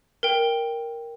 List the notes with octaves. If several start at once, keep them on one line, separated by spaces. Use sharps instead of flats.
A#4 G5